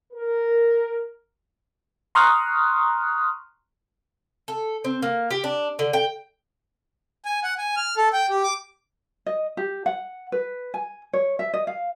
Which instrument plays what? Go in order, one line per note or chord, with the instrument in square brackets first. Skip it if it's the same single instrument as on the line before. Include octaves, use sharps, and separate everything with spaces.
[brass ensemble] A#4
[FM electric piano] A#5 C6 C#6 D#6 F6 F#6
[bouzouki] A4
C4
A#3
G4
D4
D3
G5
[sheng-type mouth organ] G#5
F#5
G#5
F6
A4
G5
G4
D6
[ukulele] D#5
G4
F#5
B4
G#5
C#5
E5
D#5
F5